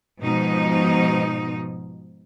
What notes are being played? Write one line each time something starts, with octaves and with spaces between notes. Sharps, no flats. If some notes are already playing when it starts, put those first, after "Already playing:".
G#2 B2 F3 D#4